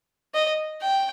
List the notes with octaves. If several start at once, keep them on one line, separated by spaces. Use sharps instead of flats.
D#5
G5